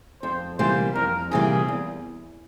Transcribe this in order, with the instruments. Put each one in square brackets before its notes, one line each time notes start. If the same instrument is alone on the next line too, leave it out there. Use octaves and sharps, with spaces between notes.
[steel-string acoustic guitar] F2 [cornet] C5
[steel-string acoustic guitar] C3 E3 G3 A#3 [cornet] C5
[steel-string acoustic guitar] F2 [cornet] A#4
[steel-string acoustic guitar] C3 E3 G3 A#3 [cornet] G#4
[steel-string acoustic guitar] E2